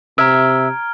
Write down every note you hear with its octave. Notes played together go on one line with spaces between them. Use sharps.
C3 E5 A#5 F6 G#6 D7